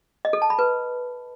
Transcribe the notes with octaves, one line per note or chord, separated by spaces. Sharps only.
D#5
A4
A5
B5
B4